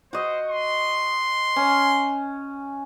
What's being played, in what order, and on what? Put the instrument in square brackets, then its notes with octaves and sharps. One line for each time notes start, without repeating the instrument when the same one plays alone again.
[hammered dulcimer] F#4 D#5 [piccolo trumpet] C5
[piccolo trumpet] C6
[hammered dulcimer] C#4